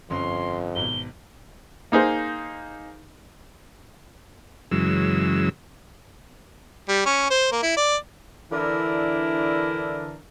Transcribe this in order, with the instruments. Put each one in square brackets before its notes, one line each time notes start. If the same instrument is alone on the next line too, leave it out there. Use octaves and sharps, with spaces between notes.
[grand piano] G1 C#4 [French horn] F2 [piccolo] C6
[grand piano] G#1 B2 [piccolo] G7
[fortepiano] A#3 D#4 G#4 C5
[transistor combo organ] F#2 C#3 E3 F#3 G#3 E6
[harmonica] G3
C#4
C5
A#3
E4
D5
[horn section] D3 E3 D4 E4 A#4